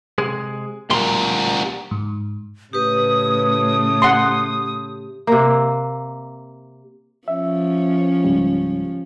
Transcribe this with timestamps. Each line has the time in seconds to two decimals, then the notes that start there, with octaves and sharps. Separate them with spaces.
0.18 C3 G#3 G#4
0.90 D2 A#2 G3 A#4 C6
1.91 G#2
2.73 A2 C#3 G4 B4 D#6
4.02 G4 F#5 C6
5.27 C3 A#3
7.28 F3 C#4 E5
8.24 C#2 G#2 G3